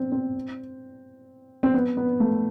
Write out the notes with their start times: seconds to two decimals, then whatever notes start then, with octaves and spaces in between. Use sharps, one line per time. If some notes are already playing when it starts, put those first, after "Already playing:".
Already playing: C4
0.12 C4
1.63 C4
1.74 B3
1.97 B3
2.20 A3